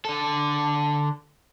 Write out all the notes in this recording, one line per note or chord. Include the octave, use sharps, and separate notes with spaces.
D3 A4